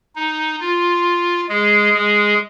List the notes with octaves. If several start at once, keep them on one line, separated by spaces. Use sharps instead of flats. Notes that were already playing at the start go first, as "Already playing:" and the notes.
D#4
F4
G#3 G#4
G#3 G#4